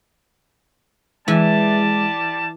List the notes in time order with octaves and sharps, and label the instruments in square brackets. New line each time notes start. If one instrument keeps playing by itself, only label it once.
[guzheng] E3 [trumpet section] G3 D5 A5 [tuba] G#3